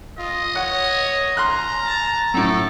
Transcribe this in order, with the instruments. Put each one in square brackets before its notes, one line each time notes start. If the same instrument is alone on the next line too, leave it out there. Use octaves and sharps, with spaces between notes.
[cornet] F4 [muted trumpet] D#5
[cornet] C#5 [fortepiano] F#5
[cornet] A#5 [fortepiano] C6 F6 F#6
[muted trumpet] A5
[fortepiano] F#2 A2 [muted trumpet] A4